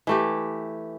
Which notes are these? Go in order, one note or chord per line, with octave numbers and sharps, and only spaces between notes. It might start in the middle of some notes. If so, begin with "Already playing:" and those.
E3 A3 G4